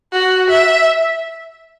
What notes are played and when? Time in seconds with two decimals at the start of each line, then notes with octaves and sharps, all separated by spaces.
0.13 F#4
0.50 E5